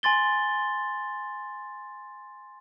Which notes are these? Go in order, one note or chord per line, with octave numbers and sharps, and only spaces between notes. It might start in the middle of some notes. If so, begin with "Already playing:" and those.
G#5 C6 A6 G7